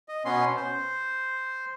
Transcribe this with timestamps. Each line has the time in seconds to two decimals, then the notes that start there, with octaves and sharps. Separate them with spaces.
0.08 D#5
0.25 B2 B3 C#4 C6
0.56 C5